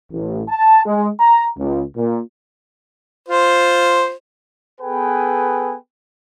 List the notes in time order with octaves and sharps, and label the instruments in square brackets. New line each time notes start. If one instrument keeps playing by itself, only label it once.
[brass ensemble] A1
A5
G#3
A#5
C#2
A#2
[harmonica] F4 C5
[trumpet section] B3 G#4 A4 B4 G5 G#5